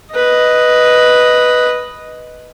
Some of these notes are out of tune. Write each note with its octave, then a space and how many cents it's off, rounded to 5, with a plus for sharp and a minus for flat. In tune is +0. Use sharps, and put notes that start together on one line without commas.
B4 +0 D#5 +0